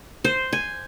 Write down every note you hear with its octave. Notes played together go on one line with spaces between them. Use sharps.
C5
G#5